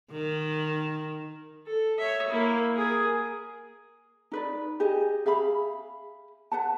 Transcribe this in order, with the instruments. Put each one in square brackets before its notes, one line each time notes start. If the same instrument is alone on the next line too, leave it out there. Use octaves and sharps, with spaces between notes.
[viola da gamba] D#3
[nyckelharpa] A4
C#5 E5
A#3 E4
G#4 A#4
[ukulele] D#4 B4 D5
G4 G#4 D#5
G#4 E5 F5 B5
B4 F#5 A5